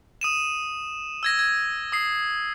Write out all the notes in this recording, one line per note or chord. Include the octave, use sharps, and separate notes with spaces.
D#6 D#7 E7
E6 G#6 A#6
G#6
D#6 C7